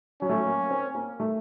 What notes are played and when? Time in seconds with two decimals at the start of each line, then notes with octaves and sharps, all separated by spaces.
0.21 F#3 C#4
0.29 A3
0.37 F#3
0.46 A#3
0.71 C4
0.95 A#3
1.20 A3